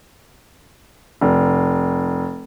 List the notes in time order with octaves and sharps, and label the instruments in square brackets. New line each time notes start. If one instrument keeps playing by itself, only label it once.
[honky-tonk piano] F1